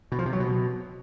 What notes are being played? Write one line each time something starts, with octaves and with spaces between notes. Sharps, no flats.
B2
F3
C3
F#3
B2